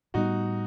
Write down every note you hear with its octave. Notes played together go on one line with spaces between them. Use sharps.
A2 G3 B3 D#4 F#4